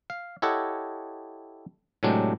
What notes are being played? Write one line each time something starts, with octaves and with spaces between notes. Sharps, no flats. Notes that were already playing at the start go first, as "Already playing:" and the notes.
F5
E4 G4 A4 C#5 D#5 F#5
A2 C3 F#3 G#3 D4 G4